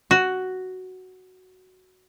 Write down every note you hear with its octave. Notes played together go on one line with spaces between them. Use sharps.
F#4